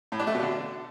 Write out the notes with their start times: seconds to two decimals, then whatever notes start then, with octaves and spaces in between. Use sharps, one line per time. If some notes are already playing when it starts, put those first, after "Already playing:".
0.12 A2
0.19 D4
0.27 A3
0.34 B2
0.42 D3